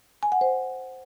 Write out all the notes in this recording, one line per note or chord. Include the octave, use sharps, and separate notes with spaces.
G#5
F#5
C5